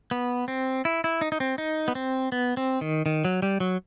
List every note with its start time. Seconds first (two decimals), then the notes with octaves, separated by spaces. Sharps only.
0.11 B3
0.48 C4
0.85 E4
1.04 E4
1.21 D#4
1.32 D#4
1.40 C4
1.58 D#4
1.88 B3
1.95 C4
2.32 B3
2.57 C4
2.81 D#3
3.06 D#3
3.25 F#3
3.42 G3
3.60 F#3